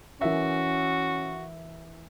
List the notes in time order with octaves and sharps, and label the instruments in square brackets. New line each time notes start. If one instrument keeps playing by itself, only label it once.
[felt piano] E3 A#4 E5 [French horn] C#4 [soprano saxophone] F#4